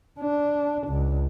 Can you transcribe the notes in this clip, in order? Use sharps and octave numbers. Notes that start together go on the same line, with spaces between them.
D4
C#2